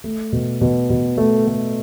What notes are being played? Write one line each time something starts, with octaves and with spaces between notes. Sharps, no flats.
A3
B2
B2
B2
A3
A3